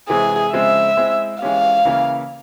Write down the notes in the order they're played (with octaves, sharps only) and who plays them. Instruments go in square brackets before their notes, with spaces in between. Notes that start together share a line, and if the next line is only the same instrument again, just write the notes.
[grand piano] C3 E3 G#3 C4 [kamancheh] G#4
[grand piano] C#3 F3 G#3 C4 [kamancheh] E5
[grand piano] G#3 C4 E4
[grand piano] E3 G#3 C#4 G4 [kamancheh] F5
[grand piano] C#3 E3 A#3 E4